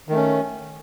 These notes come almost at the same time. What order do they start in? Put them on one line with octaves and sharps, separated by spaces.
D#3 A3 C#4